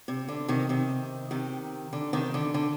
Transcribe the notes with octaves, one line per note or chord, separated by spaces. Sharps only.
C3
D3
C3 D#3
C3 D#3
C3 D#3
D3
C3 D#3
D3
D3